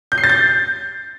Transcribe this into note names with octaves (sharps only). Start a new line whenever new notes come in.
G6
C7
A6
G6